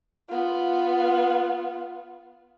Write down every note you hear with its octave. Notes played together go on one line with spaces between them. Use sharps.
B3 F4